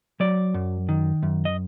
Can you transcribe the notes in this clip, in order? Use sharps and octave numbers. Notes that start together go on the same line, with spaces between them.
F#3 D5
F#2
D#3
F#2
D#5